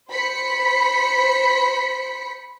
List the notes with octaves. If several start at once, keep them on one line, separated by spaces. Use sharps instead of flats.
C5 B5 B6 C#7